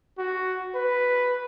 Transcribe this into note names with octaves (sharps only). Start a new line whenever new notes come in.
F#4
B4